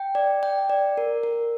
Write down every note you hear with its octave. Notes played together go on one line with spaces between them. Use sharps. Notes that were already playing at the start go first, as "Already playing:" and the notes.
Already playing: G5
D5
G5
D5
A#4
A#4